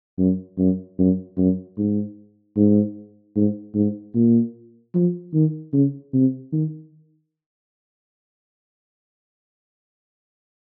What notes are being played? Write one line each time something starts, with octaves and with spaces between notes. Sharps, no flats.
F#2
F#2
F#2
F#2
G#2
G#2
G#2
G#2
A#2
F3
D#3
C#3
C3
D#3